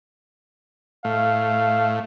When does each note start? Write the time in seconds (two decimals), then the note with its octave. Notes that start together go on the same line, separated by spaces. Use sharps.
1.05 A2 F5